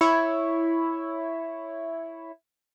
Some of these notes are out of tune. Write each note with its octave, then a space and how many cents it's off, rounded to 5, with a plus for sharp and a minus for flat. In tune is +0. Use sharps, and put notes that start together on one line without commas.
E4 +0 C#5 +0